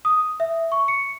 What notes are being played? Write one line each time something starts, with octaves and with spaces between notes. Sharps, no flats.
D#6
E5
C#6
C#7